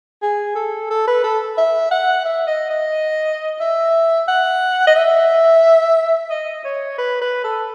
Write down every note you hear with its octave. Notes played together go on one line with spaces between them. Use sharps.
G#4
A4
A4
B4
A4
E5
F#5
E5
D#5
D#5
E5
F#5
D#5
E5
D#5
C#5
B4
B4
A4